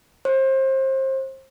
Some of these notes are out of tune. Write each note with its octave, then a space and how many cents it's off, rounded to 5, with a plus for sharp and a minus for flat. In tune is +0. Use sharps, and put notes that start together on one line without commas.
C5 +30